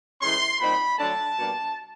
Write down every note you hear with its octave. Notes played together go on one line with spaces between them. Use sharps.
A2 E3 G#3 C#4 C6
A#2 G3 C4 D#4 B5
D3 F#3 A3 D4 A5
B2 G3 A#3 D4